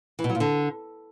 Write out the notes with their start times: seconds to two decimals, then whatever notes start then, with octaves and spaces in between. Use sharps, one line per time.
0.19 E3
0.24 B2
0.29 F#3
0.35 A#2
0.40 D3